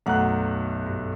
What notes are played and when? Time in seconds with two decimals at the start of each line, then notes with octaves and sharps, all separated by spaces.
0.06 B1 F#2 A3 F#5 A#5 F#6
0.86 G2